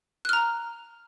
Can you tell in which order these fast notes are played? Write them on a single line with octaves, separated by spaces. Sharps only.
F#6 F6 A#5